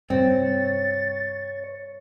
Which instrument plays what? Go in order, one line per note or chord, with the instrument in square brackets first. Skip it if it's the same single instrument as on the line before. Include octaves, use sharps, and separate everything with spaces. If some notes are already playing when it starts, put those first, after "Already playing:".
[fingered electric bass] G2 C3 [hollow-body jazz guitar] C4 [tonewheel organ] C#5 [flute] A6